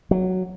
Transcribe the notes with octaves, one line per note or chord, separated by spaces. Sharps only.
F#3